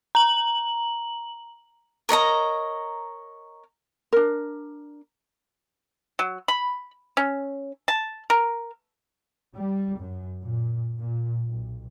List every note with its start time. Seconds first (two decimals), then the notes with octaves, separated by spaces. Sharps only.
0.15 A#5 F#7
2.09 A#4 C#5 D#5 A#5
4.13 D4 A#4
6.19 F#3
6.48 B5
7.17 C#4
7.88 A5
8.30 A#4
9.55 G3
9.98 F#2
10.42 A#2
11.00 A#2
11.46 B1